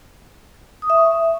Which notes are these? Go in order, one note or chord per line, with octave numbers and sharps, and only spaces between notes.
D#6
E5
C#6